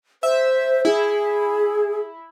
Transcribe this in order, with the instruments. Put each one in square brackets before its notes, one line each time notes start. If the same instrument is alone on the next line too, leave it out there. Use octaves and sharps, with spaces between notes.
[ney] C5 [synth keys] E5
[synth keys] E4 [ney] G#4